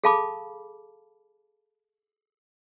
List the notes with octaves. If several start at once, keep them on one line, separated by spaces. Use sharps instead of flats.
G#4 A4 F5 A5 B5 D6